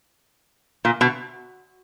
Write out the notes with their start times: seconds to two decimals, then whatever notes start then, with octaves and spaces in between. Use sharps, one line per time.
0.85 A#2
1.01 B2